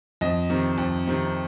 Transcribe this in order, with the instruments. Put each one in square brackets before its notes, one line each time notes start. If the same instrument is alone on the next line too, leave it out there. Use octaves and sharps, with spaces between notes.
[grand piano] F2 D#5
C3 D#3
F2
C3 D#3